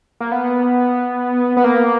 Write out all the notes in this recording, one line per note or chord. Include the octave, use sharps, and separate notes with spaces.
A#3
B3
B3
A#3